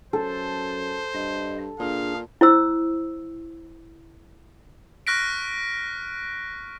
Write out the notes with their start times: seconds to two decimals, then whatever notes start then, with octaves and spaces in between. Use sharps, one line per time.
0.13 F#2 A4 C5
1.14 G2 D#5
1.80 A#2 D4 G#4 F5
2.41 E4 C5 E6
5.07 C#6 F6 F#6 A#6 B6 D7